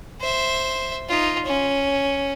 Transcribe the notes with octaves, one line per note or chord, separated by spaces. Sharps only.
C5 E5
D#4 F4
C#4